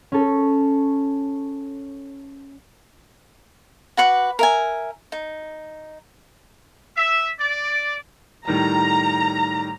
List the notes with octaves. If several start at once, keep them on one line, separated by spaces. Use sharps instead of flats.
C#4 A4
F#4 B4 F#5 D6
A#4 E5 G#5
D#4
E5
D5
A2 D#3 G3 A#5